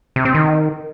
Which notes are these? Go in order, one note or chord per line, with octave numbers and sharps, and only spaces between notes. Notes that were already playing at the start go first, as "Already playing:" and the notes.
C3
C4
D#3